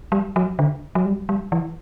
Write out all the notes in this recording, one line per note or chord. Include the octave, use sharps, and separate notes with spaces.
G3
F#3
D3
F#3
G3
G3
E3